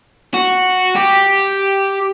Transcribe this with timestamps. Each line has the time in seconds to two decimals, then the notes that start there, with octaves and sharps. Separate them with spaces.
0.34 F#4
0.96 G4